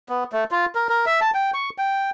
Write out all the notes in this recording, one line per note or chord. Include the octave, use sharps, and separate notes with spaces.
B3
A3
F4
A#4
A#4
E5
A5
G5
C#6
G5